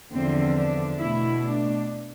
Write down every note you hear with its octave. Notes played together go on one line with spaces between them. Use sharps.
E2 D3 F3 C4
D4
B2 A3 E4
D4